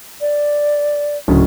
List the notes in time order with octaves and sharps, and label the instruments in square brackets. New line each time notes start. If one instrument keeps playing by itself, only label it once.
[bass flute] D5
[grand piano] D1 C#3 [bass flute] F#4